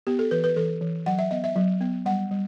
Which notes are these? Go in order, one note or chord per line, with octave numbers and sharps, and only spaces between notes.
B3 G4
A4
E3 B4
B4
E3 A4
E3
F#3 F#5
E5
B3 D#5
E5
F#3
B3
G3 F#5
G3